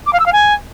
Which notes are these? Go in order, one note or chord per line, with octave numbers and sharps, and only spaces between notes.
D6
F5
E6
F5
G#5